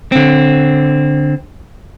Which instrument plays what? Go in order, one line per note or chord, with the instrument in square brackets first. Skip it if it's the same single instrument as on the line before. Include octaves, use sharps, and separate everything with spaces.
[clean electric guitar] D3 C4